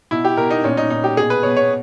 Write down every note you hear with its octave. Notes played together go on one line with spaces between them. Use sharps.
B2 E4
G4
B2 A#4
D#4
A#2 C#4
D#4
A#2 D#4
G4
B2 G#4
B4
B2 C#5
C#5